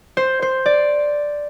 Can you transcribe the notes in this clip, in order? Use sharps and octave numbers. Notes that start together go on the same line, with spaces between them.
C5
C5
D5